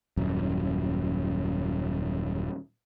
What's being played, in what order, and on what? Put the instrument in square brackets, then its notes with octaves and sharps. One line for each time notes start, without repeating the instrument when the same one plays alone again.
[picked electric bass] D#1 F#2